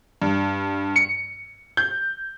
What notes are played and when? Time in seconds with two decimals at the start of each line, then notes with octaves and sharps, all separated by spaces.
0.22 G2
0.96 C#7
1.77 G6